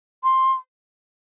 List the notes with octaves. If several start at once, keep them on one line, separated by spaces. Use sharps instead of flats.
C6